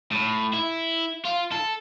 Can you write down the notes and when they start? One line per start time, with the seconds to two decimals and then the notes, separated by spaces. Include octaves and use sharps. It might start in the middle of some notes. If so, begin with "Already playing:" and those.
0.12 A2
0.53 E4
1.25 F4
1.52 A4